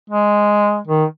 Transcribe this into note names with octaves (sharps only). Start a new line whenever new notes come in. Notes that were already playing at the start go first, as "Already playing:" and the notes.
G#3
D#3